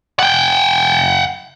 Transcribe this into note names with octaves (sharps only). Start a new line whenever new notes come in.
F#5 G5